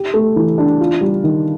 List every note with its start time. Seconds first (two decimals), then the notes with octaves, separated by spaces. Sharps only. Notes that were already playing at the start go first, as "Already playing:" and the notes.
Already playing: G4
0.14 A3
0.36 E3
0.58 D4
0.80 F4
1.01 G3
1.24 D#3